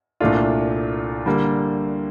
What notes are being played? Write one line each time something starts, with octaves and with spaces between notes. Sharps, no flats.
C2 A#2 A3 D4 F4
D3 G3 A#3